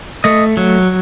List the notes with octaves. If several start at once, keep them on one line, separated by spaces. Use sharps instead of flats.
A3 D#5
F#3